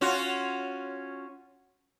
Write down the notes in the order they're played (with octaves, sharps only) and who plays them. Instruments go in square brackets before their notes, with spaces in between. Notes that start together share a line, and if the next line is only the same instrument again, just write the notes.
[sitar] C#4 F4 F#4